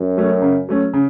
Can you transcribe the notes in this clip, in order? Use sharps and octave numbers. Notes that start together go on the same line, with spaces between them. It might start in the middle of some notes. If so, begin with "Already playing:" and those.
Already playing: F#2
F#3 A3 C#4
C#3
F#3 A3 C#4
C#3